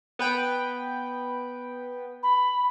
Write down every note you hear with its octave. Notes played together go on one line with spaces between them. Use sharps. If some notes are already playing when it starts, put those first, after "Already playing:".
B3 B4 G5
B5